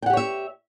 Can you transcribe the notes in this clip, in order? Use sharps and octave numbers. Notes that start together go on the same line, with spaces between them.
G4 C#5 E5 F#5 G5